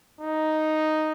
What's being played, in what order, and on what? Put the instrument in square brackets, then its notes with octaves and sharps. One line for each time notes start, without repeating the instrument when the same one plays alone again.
[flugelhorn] D#4